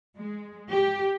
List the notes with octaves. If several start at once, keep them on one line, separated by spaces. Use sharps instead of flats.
G#3
G4